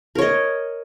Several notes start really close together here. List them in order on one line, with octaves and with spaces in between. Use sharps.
A#4 C#5 D#5